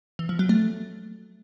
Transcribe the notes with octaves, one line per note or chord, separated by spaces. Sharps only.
E3
F3
F#3
A3